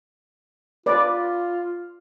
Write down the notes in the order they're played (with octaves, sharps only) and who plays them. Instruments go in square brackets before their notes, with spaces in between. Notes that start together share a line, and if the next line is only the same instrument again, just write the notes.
[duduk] F4 [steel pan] B4 D5